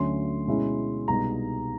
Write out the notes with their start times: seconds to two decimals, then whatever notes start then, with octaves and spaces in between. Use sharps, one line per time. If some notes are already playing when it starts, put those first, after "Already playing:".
Already playing: D2 D3 F#3 A3 C#4 C6
0.47 B2 G#3 C#4 E4
1.08 C2 B2 G#3 B3 D#4 A#5